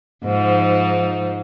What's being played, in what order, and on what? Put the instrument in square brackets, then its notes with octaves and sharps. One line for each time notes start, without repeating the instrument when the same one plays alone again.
[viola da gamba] G#2 F3 D#4